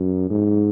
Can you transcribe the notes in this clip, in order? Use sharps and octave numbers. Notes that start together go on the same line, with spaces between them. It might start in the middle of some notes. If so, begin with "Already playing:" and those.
Already playing: F#2
G#2